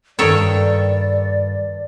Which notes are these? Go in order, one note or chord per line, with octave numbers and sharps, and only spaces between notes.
G2 D#3 A4 C#5 D5 G5